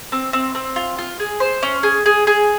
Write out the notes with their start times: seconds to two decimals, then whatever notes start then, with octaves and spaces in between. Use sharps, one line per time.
0.12 C4
0.33 C4
0.55 C4
0.76 F4
0.98 F4
1.20 G#4
1.40 C5
1.63 C#4
1.83 G#4
2.06 G#4
2.27 G#4